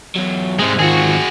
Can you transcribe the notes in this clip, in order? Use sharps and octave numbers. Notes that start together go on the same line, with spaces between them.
E2 F#3
G#2 C3 G#3 C4
D#3 F4 F#4 G#4